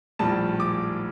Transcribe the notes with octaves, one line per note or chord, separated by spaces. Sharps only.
A#1 A2 G3 A5
D6